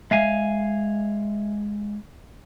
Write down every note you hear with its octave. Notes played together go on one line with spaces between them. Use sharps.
G#3 E5 F5 G#5